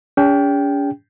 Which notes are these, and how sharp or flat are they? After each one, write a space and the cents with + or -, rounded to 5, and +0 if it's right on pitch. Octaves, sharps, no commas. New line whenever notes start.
C#4 +45 G#4 -40 G5 +0